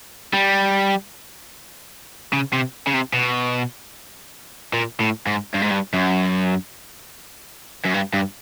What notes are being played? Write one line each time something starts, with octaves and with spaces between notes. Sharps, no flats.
G3
C#3
C3
C#3
C3
B2
A#2
A2
G#2
G2
G#2
G2
F#2
F#2
G2
G2